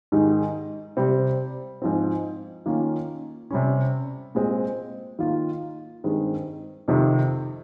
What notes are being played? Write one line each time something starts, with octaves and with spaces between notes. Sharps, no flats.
G#2 D#3 G#3 D#4
C3 G3 C4
G#2 F3 C4
D#3 A#3 C#4 F4
C3 G3 C#4
A#2 G#3 C4
D#3 A#3 F4
G2 D#3 G#3 C4
F2 C3 D#3